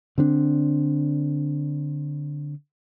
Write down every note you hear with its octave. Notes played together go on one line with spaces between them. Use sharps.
D3 C4 D4